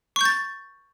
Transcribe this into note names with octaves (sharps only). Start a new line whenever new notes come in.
C#6 G6 A6